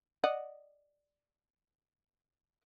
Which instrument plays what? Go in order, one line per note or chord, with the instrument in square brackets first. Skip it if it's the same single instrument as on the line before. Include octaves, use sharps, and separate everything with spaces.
[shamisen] D5 D#5 F#5